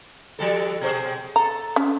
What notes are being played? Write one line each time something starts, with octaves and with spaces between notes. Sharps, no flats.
F3 G3 A4
B2 G#4 C5
A4 A#5
C#4